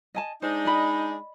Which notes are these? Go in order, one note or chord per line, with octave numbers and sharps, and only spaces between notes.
D#5 G#5 A5
G#3 D4 D#4 C5
D5 D#5 B5